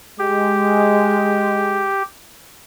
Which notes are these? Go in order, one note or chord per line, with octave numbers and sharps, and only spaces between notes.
G#3 G4